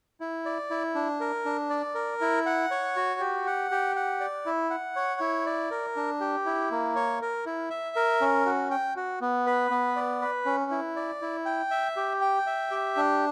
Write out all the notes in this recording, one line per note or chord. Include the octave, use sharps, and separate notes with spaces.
E4
D5
E4
D4
A#4
D4
D5
A#4
E4
F#5
C#5
F#4
G4
F#5
G4
F#5
D5
E4
F#5
C#5
E4
D5
A#4
D4
G4
E4
A#3
C#5
A#4
E4
E5
A#4
C#4
F#4
G5
F#4
B3
B4
B3
D5
B4
C#4
E4
D5
E4
G5
E5
G4
G5
E5
G4
D4